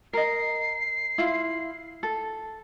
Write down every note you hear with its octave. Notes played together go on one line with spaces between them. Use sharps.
A#4 D#5 C7
E4 F4
A4